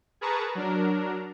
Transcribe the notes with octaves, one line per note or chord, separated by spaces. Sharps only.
G#4 A#4 B4 A5 A#5 C#6
F#3 D4 A#4